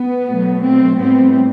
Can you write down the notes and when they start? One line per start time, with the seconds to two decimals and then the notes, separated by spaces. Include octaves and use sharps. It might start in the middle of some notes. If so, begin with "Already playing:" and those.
Already playing: B3
0.26 B2 F#3 A3
0.62 C4
0.98 A2 G3 B3 C4